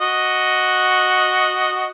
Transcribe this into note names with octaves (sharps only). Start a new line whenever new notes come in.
F#4 D#5